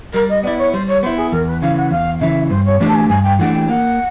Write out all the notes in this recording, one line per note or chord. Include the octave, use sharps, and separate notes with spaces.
G3 A#4
D#5
B3 E4 D5
C#5
G3 C5
C#5
B3 E4 C5
G#4
E2 A#4
B4
C#3 E3 F5
F#5
E2 F5
C#3 E3 E5
G2 C5
C#5
E3 A3 D4 G4 D5
A5
G#5
G2 G#5
G5
E3 A3 D4 G4 F#5
G5
A#3 F#5